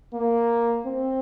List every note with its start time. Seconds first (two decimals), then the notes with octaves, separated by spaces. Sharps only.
0.14 A#3
0.86 C4